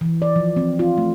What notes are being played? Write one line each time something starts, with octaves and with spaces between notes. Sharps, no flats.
E3
D5
F3
C4
F4
A3